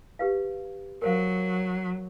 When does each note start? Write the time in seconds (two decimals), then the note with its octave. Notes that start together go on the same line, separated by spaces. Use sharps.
0.19 G4 B4 F5
1.02 F#3 A#4 C5 F5